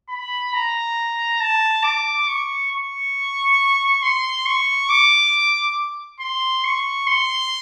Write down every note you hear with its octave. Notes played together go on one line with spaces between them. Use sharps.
B5
A#5
A5
D6
C#6
C#6
C6
C#6
D6
C6
C#6
C6